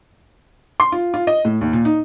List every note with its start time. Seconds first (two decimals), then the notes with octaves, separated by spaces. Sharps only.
0.80 C6
0.92 F4
1.14 F4
1.27 D#5
1.45 A2
1.61 D#2
1.73 A#2
1.85 D#4